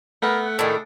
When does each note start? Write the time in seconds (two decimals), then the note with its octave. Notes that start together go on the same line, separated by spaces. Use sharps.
0.22 A3 B3 A#4 B4
0.46 F#5
0.59 A2 D#3 D4 G#4 A4